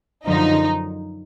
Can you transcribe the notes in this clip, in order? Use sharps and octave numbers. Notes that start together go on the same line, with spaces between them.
F#2 D3 F3 D#4